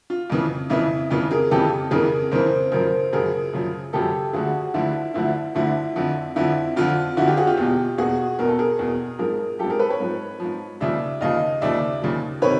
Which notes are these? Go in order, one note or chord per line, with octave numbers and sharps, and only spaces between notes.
F4
F2 C#3 E3
F2 C#3 E3 E4
F2 C#3 E3 F4
G#4 A#4
F2 C#3 E3 G4 A4
F2 C#3 E3 G#4 A#4
F2 C#3 E3 A#4 C5
F#2 C#3 F3 A#4 C5
F#2 C#3 F3 G#4 A#4
F#2 C#3 F3
F#2 C#3 F3 G4 A4
D2 D3 F3 F#4 G#4
D2 D3 F3 E4
D2 D3 F3 E4
D2 D3 F3 E4
F2 D3 F3
F2 D3 F3 E4
F2 D3 F3 F4
F2 D3 F3 E4 F#4
F4 G4
F#4 G#4
F4 G4
E2 B2
E2 B2 F#4 G#4
E2 B2 A#4
A4
G#4 A#4
E2 B2
G#2 F3 G#4 A#4
F3 G4 A4
G#2
G#4 A#4
A4 B4
B4 C#5
G#2 F3
F3
G#2
D#2 C#3 F3 D5 E5
D#2 C#3 F3 D#5 F5
D#2 C#3 F3 D5 E5
D#2 C#3 F3
C3 D#3 B4 C#5